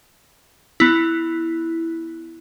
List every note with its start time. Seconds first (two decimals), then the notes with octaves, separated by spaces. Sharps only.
0.80 B3 E4